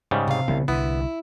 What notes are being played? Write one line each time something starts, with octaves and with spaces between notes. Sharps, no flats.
G#2 C#3 G3
C3 F5
C2 C#3 B3
C2 D3 B3 E4